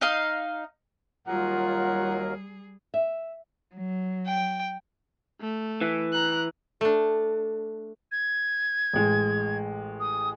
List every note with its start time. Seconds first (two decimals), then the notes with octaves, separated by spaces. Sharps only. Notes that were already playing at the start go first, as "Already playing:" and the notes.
0.01 D#4 D#5 F5
1.27 D#2 F#3 G3 F4 G#4 A#4 F#5
2.94 E5
3.76 F#3
4.26 G5
5.41 A3
5.81 E3
6.12 A#5 F#6
6.81 A3 D4
8.12 G#6
8.94 A1 G#3
10.00 D#6